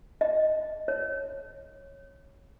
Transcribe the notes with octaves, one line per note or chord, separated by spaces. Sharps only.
D#5
C#5